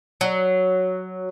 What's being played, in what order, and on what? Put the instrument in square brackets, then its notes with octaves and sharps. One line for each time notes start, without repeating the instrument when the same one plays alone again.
[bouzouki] F#3